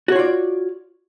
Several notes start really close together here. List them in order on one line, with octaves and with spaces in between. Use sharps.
F#4 C#5 F4 D5